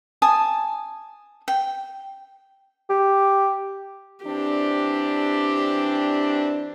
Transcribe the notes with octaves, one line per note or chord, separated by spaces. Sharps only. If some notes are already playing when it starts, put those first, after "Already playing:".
G#5 A5 D#6
G5
G4
E3 C4 D4 G4